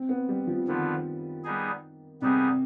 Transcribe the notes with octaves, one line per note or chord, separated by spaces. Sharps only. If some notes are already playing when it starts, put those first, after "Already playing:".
Already playing: C4
B3
G3
F3
D3 D#3 F3 B3
G3 B3 D#4 G#4
C3 G3 B3 D#4 G#4